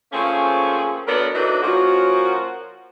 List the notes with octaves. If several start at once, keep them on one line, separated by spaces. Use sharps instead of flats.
F3 A3 A#3 C4 C#4 G#4
F#3 B3 D4 A4 A#4
E3 F#3 A3 D4 D#4
F3 A#3 C#4 F#4